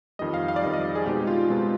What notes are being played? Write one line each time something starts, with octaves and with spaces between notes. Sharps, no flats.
F2 D#3 G3 D#5
F5
F5
D5
F2 D#3 G3 D#5
D#5
G#4
B2 G#3 C4 D#4 G4
F4
B2 G#3 C4 D#4